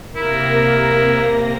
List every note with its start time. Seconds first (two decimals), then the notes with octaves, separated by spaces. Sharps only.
0.16 C3 A#3 E4 A#4 A#6